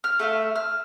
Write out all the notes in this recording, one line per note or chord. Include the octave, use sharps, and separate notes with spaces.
F6
A3 E5 F5
F6